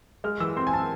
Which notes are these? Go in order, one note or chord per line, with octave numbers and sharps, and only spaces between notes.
G#3 F6
E3 E6
C4 C6
G#5
C4 A5